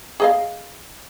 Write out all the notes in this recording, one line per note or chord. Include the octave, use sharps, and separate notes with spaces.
G#4 D#5 F5